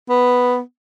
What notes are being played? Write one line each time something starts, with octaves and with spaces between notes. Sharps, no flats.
B3